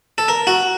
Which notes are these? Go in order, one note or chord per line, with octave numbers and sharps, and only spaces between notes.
A4
A#4
F#4